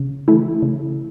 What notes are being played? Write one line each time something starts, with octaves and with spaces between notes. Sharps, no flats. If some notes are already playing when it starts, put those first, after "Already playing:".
Already playing: C#3
E3 A3 E4
C#3